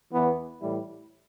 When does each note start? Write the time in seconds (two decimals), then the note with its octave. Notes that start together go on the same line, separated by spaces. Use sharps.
0.13 E2 E3 B3
0.61 A2 E3 G3 E4